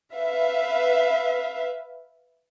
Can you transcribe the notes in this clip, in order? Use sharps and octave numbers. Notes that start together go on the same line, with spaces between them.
B4 E5 F5